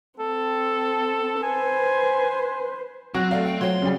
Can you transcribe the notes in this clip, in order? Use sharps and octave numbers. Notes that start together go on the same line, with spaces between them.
C4 A4
B4 C5 G#5
F#3 C4 F#4 F#6
A3 D5 F5
G5
F#3 C5 C#5 C6
C#3 G3